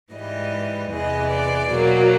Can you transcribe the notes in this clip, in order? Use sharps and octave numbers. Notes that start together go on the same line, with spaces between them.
G#2 E3 G3 D#5
E2 C3 E3 G#3 D#5
D5
B2 F#3 A#3